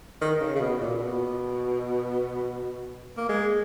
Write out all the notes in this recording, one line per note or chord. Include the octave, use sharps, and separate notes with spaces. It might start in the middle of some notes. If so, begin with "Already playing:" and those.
D#3
C#3
C#3
B2
A#2
B2
A#3
G#3